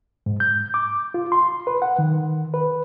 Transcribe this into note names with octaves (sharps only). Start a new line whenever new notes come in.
G#2
G6
D6
F4
C6
B4
F#5
D#3
B4